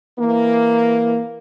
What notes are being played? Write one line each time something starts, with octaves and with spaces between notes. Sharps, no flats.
E3 A#3